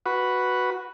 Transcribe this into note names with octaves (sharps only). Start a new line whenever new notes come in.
F#4 B4